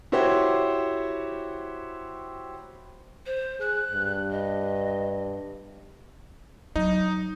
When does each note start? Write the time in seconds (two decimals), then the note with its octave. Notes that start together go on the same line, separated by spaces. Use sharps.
0.12 E4 F#4 G4 C5 C#5
3.26 C5
3.60 G#4 F#6
3.92 G2
4.31 D#5
6.76 F#3 D#4